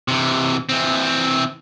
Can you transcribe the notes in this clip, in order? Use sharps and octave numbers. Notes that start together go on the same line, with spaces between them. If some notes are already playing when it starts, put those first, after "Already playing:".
C3 E3
E3 C4